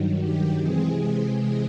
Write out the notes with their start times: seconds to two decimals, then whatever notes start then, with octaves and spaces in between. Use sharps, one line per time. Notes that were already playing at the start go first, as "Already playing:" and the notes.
Already playing: G2 D#3 F#3
0.20 G4
0.58 C3 E3 G#3 C4 G#4
1.33 G#4